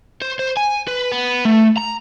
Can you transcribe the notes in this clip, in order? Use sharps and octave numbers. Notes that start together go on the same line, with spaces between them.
C5
C5
G#5
B4
B3
A3
A#5